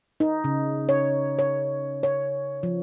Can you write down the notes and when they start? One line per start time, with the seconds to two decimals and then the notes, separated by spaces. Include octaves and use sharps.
0.20 D#4
0.44 C#3
0.89 C#5
1.39 C#5
2.03 C#5
2.63 F3